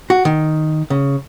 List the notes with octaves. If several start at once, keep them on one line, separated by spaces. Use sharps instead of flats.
F#4
D#3
C#3